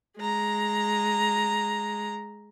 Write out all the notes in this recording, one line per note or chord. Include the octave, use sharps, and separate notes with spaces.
G#3 A#5